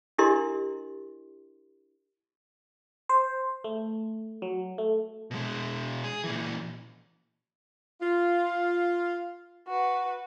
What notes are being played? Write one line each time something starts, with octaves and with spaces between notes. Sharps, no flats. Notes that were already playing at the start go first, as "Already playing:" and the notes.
D4 E4 G4 A#4 D#5 C6
C5
A3
F#3
A3
B2 G#3
G#4
A#2 E3
F4
F#4 B4